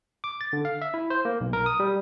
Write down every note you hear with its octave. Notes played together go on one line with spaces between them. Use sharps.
D6
A6
D3
F5
E5
E4
C5
A#3
B1
A#4
D#6
G3